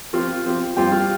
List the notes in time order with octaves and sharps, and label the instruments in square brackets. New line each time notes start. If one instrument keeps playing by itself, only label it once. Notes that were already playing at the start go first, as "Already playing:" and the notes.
[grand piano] F3 C4 G4 [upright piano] F4
[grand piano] F3 C4 G4
[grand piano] G2 F3 C4 F4 [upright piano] G4
[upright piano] F4